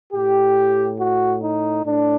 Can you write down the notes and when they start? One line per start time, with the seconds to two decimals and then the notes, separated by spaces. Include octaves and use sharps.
0.13 A2 G4
1.00 F#4
1.43 D#4
1.86 A2 D4